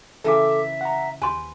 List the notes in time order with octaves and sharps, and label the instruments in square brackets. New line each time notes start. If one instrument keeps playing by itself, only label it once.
[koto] C#3 E3 A#4 [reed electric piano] A4 D6 [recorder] E5
[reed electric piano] F#5 A#5
[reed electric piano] D#2 [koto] B4 C5 [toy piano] G#5 C6